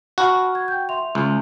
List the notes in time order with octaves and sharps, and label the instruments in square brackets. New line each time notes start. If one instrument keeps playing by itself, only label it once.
[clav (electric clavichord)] F#4 [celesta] A5 B5 F6
[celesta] G#6
G5 G6
E5 C6 F7
[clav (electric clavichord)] C#2